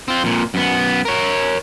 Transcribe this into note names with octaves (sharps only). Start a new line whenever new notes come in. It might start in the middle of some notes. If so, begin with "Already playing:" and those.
C4 F4
F2 A#2
F#2 B3
A#4 C#5